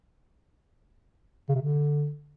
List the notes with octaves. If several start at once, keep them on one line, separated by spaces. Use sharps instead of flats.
C#3
C3
D3